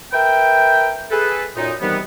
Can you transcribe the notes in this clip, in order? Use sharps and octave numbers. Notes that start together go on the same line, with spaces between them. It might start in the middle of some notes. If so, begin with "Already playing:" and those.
A#4 B4 E5 G5
G#4 A4 B4
F#2 A#2 D#4
C3 D#3 E3 G3 B3